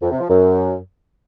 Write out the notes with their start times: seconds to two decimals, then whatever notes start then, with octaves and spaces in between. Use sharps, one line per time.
0.02 F2
0.11 C3
0.21 F3
0.30 F#2